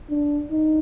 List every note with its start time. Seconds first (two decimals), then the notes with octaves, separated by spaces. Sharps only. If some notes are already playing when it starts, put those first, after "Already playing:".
0.10 D4
0.51 D#4